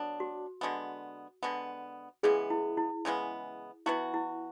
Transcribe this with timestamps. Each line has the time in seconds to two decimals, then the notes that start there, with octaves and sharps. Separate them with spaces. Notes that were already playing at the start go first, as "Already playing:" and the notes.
Already playing: F#3 B3 D4
0.20 F#4
0.61 D3 G#3 B3
1.43 D3 G#3 B3
2.23 C#3 E3 G#3 B3 G#4
2.50 E4
2.77 E4
3.05 C#3 E3 G#3 B3
3.86 E3 B3 E4 F#4
4.14 E4